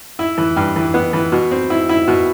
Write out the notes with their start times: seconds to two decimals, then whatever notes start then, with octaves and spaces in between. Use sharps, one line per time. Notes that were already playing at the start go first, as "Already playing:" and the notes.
0.19 E4
0.38 E3
0.56 G2
0.76 E3
0.94 B3
1.13 E3
1.32 B2
1.51 C4
1.70 E4
1.89 E4
2.08 B2